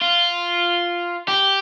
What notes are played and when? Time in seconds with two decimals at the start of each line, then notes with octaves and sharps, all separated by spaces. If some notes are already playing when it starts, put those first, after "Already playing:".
0.01 F4
1.28 G4